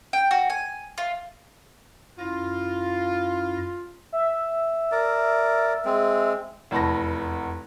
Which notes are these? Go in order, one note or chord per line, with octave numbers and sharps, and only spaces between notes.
G5
F#4
G#5
F4
F#2 E4 F4 A#6
E5
A#4 D5
G#3 C4
F1 E2 A5 B5 A#6